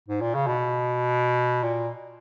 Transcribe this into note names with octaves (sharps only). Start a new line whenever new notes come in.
G#2
A#2
C#3
B2
A#2